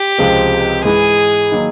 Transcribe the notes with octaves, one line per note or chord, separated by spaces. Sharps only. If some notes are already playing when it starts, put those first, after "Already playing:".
Already playing: G4
C#2 C3 F3 G#3 C4
G#2 E3 G#3 G#4
D#3 F#3 A#3